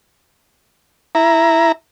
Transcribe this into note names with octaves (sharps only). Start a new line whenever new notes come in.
E4 A#5